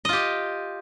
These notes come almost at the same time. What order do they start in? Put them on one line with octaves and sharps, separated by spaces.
D#5 F4 G4